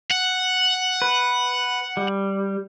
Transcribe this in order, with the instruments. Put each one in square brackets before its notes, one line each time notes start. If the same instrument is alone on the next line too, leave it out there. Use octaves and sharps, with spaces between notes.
[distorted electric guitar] F#5
[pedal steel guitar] B4
G3